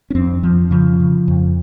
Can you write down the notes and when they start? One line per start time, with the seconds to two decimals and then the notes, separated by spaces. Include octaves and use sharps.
0.10 C#4
0.15 F2 C4
0.43 F2 F3
0.71 C#3 F3
1.00 C#3
1.28 F2